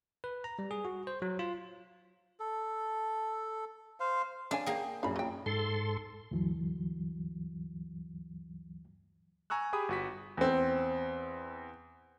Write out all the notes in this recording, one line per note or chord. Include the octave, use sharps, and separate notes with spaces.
B4
A#5
G3
G#4
F#4
C5
F#3
F4
A4
C5 F5
D4 C#5 F5 G#5
A#3 G#4 G5
A#1 F#2 F5 B5
F#3 G5
G#2 A4 C6
D2 G2 E3 F#3
G#5 A#5 C#6 E6 F#6
G4 G#4 G5 B5 D#6
G1 F#4 B6
E2 C4